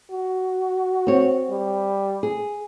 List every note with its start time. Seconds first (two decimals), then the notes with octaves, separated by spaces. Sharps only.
0.11 F#4
1.07 C4 C#5
1.50 G3
2.23 G#4